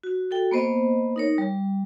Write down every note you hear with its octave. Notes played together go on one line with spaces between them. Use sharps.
F#4
F#4 A4 G5
A#3 B3 C5 D#5
D#4 A#4 C#5
G3